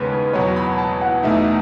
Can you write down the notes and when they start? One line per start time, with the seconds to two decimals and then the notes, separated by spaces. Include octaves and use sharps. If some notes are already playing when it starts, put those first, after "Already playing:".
Already playing: D#2 C#3 G#3 B3 B4 C#5
0.12 B4
0.33 E2 B2 F#3 B3 C#5
0.56 B5
0.78 A5
1.01 F#5
1.23 E2 B2 A3 D#4 E5